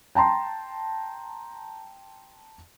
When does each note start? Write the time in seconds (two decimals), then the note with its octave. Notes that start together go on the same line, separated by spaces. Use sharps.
0.15 G5 A5 A#5 C6